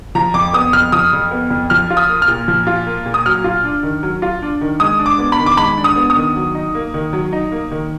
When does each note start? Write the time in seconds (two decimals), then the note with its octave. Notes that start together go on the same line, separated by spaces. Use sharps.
0.15 F3 A#5
0.34 F2 D6
0.53 B3 D#6
0.73 F2 F6
0.92 F3 D#6
1.13 F2
1.31 B3
1.50 F2
1.70 F3 F6
1.90 F4
1.97 D#6
2.09 A#3
2.22 F6
2.28 A#2
2.48 F3
2.67 F4
2.87 A#3
3.06 A#2
3.14 D#6
3.25 F#3 F6
3.44 F4
3.64 D4
3.83 D#3
4.03 F#3
4.22 F4
4.42 D4
4.61 D#3
4.80 G#3 D#6
4.99 D4
5.06 D6
5.19 B3
5.32 B5
5.39 D#3
5.46 D6
5.57 G#3 B5
5.77 D4
5.84 D#6
5.96 B3
6.10 D#6
6.15 D#3
6.36 F#3
6.55 D#4
6.75 A#3
6.94 D#3
7.13 F#3
7.33 D#4
7.52 A#3
7.71 D#3